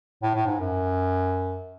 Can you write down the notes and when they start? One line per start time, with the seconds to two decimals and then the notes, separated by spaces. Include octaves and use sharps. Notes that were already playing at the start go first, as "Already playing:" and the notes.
0.22 A2
0.34 A2
0.46 G#2
0.59 F#2